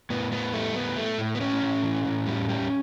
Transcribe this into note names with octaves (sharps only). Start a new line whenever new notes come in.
A2 B3
A2 B3
G3 A3
A2 B3
A2 A3
A2
B3
A2 C#4
A2
E3
A2
G3
G3